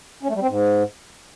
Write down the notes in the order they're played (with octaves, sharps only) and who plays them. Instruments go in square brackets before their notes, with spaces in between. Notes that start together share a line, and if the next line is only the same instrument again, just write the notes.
[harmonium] C#4
A3
G3
C4
G#2